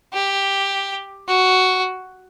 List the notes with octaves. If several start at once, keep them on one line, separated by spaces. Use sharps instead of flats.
G4
F#4